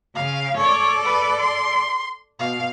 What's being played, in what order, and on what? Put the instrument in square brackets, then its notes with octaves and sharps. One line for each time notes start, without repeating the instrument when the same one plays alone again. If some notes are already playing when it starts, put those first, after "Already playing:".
[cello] C#3 [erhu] F5
[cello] A4 D5 [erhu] C#5
[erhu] B4
C6
[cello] B2 [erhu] F5